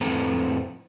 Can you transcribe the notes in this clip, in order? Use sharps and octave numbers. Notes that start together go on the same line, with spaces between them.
F2 A2 C4 A4 B4 A#5